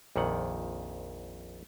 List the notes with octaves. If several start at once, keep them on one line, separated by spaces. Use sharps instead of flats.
A#1 F2 A#2 D#3 F#5